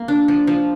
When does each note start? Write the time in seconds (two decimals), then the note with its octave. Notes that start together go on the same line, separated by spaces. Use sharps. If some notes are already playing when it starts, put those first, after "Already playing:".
Already playing: A#3
0.08 D4
0.28 F3
0.47 F3